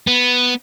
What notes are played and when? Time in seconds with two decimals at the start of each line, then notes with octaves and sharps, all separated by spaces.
0.07 B3